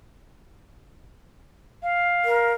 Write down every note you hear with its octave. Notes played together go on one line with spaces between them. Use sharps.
F5
A#4